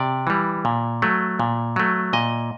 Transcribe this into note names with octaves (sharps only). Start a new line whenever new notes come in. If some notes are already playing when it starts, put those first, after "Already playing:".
Already playing: C3 D5
E3 G3
A#2
F#3 A3
A#2
F#3 A3
A#2 D#5